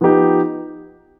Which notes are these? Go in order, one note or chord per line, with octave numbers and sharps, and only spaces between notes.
F3 B3 D#4 G4